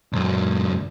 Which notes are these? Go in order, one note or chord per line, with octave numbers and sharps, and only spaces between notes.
C#2 F#2